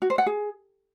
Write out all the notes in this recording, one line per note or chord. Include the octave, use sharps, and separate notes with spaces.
F#4
C5
F#5
G#4